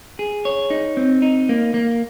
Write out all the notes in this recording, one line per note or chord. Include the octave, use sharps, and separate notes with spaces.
G#4
C#5
D#4
C4
D#4
A#3
A#3